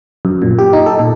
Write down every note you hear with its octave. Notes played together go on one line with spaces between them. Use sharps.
F#2
A#2
G4
D#4
A4
A#2